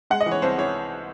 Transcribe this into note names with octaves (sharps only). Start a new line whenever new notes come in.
G#3 F#5
D#5
E3
C#5
C2 C5
E3 C#5